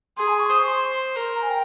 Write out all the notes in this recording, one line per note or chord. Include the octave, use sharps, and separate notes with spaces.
G#4 C6
G#5
C#6
C5 D#6
C#6
C6
A#4
A#5
G#5
G5